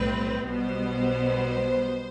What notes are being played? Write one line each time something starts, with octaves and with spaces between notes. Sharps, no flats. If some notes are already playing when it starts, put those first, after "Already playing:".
Already playing: B1 A2 G3 C4 B4
B1 B2 G3 B3 C5